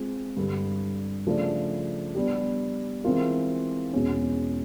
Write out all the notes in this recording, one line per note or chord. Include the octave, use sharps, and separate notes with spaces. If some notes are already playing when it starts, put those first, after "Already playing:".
Already playing: G#3 C4 F4
G2 D3 G3
C#3 F3 A3 D4
G3 B3 D4 G4
E3 G#3 C4 F4 A#4
E2 B2 G#3 C#4